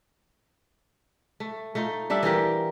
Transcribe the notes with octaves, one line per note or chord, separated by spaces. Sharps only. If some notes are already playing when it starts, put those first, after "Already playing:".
A3
A3 D#4 F4
G3 D4 A4 E5
E3 F4 G4 A#4